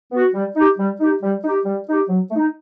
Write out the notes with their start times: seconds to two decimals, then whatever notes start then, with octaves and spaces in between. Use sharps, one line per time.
0.12 B3 F#4
0.34 G3
0.56 D#4 G4
0.78 G3
1.00 D#4 G4
1.22 G3
1.44 D#4 G4
1.66 G3
1.88 D#4 G4
2.09 F#3
2.31 A3
2.36 D#4